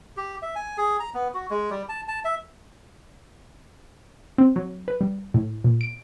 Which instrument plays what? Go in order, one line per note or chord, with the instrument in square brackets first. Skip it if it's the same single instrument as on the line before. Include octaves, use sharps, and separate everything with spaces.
[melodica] G4
E5
G#5
G#4
A#5
B3
F#4
G#3
G3
A5
A5
E5
[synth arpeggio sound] C4
F#3
B4
G3
A2
A#2
D7